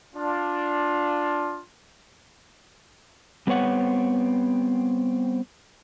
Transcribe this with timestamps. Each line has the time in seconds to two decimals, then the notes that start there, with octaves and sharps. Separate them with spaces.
0.16 D4 F4
3.47 G3 B3 C4 B4 C#5 F#5